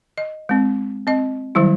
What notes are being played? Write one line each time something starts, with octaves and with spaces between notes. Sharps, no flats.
D#5
G#3 C4
C4 D#5
D#3 F#3 G3 E4